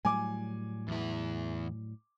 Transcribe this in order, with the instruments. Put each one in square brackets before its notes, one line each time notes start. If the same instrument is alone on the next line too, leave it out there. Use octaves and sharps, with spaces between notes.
[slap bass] A2 F#3 G3 [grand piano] G#5 D6
[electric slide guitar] E2 E4